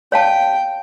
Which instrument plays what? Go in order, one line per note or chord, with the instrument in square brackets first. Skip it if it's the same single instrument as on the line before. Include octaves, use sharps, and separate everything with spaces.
[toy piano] C#5 F5 A5 [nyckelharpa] G5